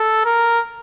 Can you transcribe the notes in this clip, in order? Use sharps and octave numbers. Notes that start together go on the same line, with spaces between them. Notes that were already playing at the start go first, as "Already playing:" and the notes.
Already playing: A4
A#4